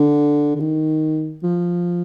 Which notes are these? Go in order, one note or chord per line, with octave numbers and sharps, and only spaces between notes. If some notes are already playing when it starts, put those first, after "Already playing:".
Already playing: D3
D3
D#3
F3